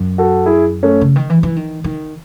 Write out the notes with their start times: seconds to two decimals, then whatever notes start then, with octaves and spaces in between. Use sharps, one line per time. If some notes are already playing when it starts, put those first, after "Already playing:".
Already playing: F#2
0.18 F#4 A4
0.46 E4 G#4
0.83 A3 C#4
1.01 C#3
1.16 D#3
1.30 E3
1.43 E3
1.56 D#3
1.84 D#3